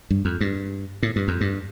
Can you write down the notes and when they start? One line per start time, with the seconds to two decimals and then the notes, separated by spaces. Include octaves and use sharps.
0.11 G2
0.25 F2
0.41 G2
1.03 A2
1.16 G2
1.28 F2
1.41 G2